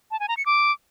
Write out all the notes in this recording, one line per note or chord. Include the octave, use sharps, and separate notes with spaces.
A5
G#5
A#5
C#7
D6